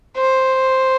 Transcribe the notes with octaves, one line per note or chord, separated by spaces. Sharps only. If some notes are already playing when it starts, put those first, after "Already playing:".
C5